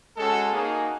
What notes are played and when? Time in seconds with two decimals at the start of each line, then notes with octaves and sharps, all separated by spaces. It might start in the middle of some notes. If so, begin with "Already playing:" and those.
0.17 G#3 C#4 F#4 A4
0.52 A#3 D#4 F#4 G#4